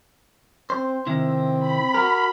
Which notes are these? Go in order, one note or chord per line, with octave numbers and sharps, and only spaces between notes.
C4 C5
C3 D#3 C4 E4
B5
F#4 A#4